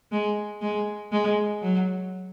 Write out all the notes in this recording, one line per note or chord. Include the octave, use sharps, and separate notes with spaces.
G#3
G#3
G#3
F#3